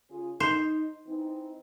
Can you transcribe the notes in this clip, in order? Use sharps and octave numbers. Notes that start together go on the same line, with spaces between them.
C#3 F4 G#4
D#4 C5
E3 C4 D#4